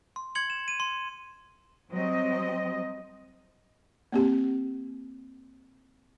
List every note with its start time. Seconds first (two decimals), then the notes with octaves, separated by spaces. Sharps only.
0.16 C6
0.35 C6 G#6 C#7 F#7
0.50 E7
0.68 D#7
0.80 C6
1.91 F#3 G3 C4 D#5
4.12 A#3 C4 G4